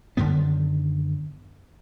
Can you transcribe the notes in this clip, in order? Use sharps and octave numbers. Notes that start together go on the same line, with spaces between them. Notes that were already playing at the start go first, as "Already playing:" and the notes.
F#2 D3 D#3 B3